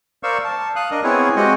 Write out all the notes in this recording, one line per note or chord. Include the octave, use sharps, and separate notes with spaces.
A#4 C5 D5 F5 C#6 E6
A5
F5 D#6 F#6
D4 A#4 D#5
B3 C4 E4 G#4 B4 C#5
G#3 C4 F#4 G4 D#5 F#5